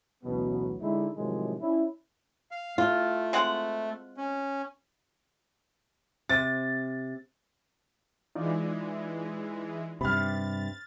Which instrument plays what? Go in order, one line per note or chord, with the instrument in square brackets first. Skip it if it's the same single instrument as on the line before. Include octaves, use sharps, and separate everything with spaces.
[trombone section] A1 D2 B2 F#3 B3
D3 G#3 D#4 E4
A2 C3 D#3 F3 F#3 G#3
C#4 D4 E4
[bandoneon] F5
[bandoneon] A3 [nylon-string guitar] F4
[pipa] G#3 C4 F#5
[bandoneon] C#4
[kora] C3 [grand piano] A6
[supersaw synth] E3 G#3 [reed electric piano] D#4 F4 D5
[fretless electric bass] G2 C3 [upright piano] B5 F6 [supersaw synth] A6